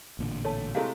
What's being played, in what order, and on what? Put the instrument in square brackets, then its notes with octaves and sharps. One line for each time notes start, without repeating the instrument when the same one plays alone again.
[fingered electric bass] A1 A#2 D3
[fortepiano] A3 [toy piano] C#5 A5
[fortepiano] C3 G#3 A3 [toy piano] E4 G4 F5